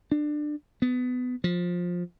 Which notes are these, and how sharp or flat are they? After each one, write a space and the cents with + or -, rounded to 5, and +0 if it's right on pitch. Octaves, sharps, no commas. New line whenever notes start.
D4 +20
B3 +20
F3 +15